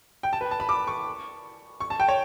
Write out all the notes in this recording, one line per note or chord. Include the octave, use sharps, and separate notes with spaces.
G5
A5
B4
A5
B5
D6
C#6
C#6
A5
G5
C#5